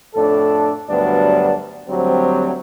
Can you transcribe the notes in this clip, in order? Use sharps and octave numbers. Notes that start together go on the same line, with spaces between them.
F2 A2 D4 A4
D2 G2 F#3 G3 B3 D4
D2 F#3 G3 C4